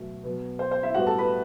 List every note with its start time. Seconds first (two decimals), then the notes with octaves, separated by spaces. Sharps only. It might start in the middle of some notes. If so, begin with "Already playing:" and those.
Already playing: B2 F#3 A3
0.24 B2 F#3 B3
0.59 C5
0.71 C5
0.83 E4 E5
0.94 A2 G3 B3 F#4 F#5
1.07 A4 A5
1.19 B4 B5